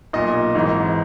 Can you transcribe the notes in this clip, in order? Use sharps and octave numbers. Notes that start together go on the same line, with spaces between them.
B1 A#2 D#5
G#1 G#2 E3